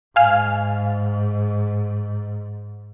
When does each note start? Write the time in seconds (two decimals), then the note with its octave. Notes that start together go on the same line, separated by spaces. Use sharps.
0.16 G#2 F5 G#5 F6